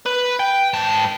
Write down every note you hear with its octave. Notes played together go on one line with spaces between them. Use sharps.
B4
G5
G#2 A5